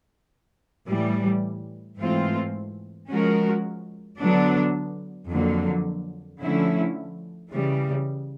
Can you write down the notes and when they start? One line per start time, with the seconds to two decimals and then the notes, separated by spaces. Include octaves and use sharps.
0.88 A2 E3 G3
1.99 G#2 E3 A3 C4 F4
3.09 F3 G#3 C#4 F#4 A#4
4.19 D3 F#3 B3 D4
5.30 F2 D3 F#3 A#3
6.40 D3 F3 A3 C#4 E4
7.51 C#3 E3 G3